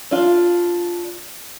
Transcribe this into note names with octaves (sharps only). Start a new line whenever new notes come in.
D4 F4